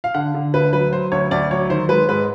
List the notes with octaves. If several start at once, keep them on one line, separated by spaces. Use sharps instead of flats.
F5
D3 F#5
D3
D2 B4
F#3 B4
F#3 C5
D2 C#5
D2 D5
F#3 C#5
D#3 C5
G#3 B4
G#2 B4